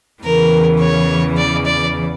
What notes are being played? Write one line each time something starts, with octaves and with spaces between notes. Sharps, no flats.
E2 C#3 E3 A#4
C#5
D5
D5